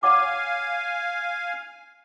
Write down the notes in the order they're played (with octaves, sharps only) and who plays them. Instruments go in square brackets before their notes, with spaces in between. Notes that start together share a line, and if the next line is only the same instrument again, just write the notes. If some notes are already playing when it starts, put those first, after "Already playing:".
[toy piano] C#5 F#5 D6 [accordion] F5 G#5